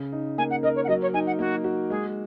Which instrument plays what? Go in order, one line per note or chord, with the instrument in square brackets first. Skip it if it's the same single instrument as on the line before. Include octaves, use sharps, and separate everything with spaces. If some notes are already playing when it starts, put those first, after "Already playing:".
Already playing: [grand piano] C#3
D#4
[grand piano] A#3 [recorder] G#5
[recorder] F#5
[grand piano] A#4 [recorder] D#5
[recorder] C#5
F#5
[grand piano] F#3 [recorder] D#5
[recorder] C#5
[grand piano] D#4 [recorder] G#5
[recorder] F#5
[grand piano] A#3 [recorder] F#4
[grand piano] F#4
[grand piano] G#3 [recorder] G#4